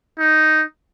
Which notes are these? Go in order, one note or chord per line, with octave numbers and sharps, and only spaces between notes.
D#4